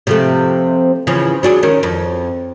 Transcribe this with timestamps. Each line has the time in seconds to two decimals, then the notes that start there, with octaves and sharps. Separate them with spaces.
0.07 C3 F3 A3
1.07 C#3 E3 F3
1.43 F#3 D4 G#4
1.63 D#3 C#4
1.83 F2